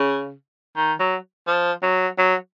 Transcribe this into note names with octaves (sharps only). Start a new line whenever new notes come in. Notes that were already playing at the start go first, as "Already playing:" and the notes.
Already playing: C#3
D#3
F#3
F3
F#3
F#3